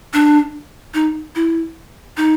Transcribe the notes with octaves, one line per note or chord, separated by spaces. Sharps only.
D4
D#4
E4
D#4